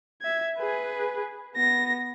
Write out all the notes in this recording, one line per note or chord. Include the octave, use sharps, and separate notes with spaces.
E5 G#6
G#4 B4
B3 A#6